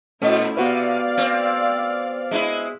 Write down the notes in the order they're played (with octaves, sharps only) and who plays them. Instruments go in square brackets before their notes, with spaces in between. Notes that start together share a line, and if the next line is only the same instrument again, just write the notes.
[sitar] A#2 [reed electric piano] A3 C#4 A4 [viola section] E4 F#4 C5
[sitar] C3 [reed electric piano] B3 F#4 B4 [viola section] D5 F5
[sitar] C4
G#3 D#4 E4